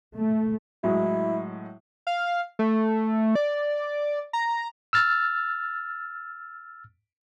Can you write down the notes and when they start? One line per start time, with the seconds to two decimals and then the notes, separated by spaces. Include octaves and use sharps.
0.15 A3
0.84 A2 F#3 G#3 E4
2.07 F5
2.59 A3
3.35 D5
4.33 A#5
4.93 E6 F6 A6